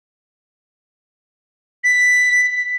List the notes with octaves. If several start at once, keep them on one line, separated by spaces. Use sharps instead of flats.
B6